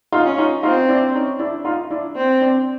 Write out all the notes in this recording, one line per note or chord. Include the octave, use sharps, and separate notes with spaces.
D#4 F4
C#4
D#4 F4
C4 D#4 F4
D4 E4
C#4 D#4
D4 E4
D#4 F4
D4 E4
C4
C4 D4